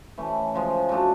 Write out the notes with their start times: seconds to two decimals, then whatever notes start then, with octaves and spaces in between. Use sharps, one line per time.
0.18 E3 A3 C#4
0.54 C#3 F3 G#3
0.89 F#3 A3 D4